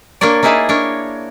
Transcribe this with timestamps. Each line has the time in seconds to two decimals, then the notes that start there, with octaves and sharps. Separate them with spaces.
0.21 A#3 D4 A#4 C#5 D5
0.43 A#3 D#4 E4 G#4 D#5 A5
0.69 D4 A#4 C#5